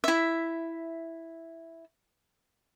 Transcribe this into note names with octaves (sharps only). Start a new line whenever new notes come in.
E4 E5